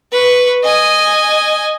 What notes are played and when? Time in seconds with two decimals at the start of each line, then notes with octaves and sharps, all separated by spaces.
0.12 B4 C#6
0.63 D#5 G#5